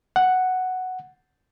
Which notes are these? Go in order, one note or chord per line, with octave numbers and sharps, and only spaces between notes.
F#5